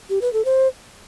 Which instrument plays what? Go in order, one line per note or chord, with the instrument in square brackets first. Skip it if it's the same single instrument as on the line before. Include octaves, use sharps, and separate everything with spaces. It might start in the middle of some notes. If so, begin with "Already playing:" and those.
[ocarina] G4
B4
A4
C5